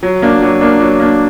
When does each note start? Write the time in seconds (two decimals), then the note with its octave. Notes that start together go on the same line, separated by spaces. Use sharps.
0.03 F#3
0.22 A#3 D4
0.42 F#3
0.61 A#3 D4
0.80 F#3
1.00 A#3 D4